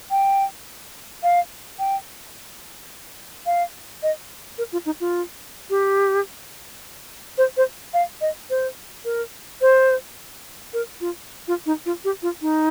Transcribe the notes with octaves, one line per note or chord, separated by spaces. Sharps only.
G5
F5
G5
F5
D#5
A#4
F4
D#4
F4
G4
C5
C5
F5
D#5
C5
A#4
C5
A#4
F4
F4
D#4
F4
G4
F4
D#4